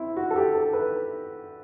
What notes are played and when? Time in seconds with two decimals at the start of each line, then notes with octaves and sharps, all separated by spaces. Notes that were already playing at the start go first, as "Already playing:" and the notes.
Already playing: C4 E4
0.17 F#4
0.30 A4
0.36 G4
0.55 A4
0.73 B4